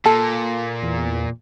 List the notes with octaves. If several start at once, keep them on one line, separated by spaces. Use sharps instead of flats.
A#2 A4
E2